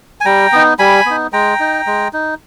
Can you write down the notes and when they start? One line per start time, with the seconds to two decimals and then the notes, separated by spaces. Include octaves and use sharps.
0.21 G#5
0.25 G3 G5 A#5
0.52 B3 D#4
0.79 G3 G#5 B5
1.06 B3 D#4
1.33 G#3 G5 A#5
1.60 D#4
1.87 G#3
2.13 D#4